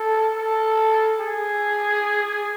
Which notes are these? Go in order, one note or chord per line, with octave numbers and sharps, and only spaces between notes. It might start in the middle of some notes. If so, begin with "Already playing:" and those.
Already playing: A4
A4
G#4